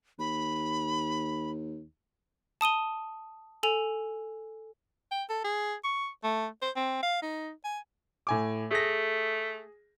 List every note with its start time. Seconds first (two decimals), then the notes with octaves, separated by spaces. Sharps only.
0.19 D#2 B5
2.61 A5 D#6 D#7 G7
3.63 A4 G#5 F7
5.11 G5
5.29 A4
5.44 G#4
5.84 C#6
6.24 A3
6.62 C5
6.76 C4
7.03 F5
7.22 D#4
7.64 G#5
8.27 A2 G#5 D6
8.71 A3 G#4 A#6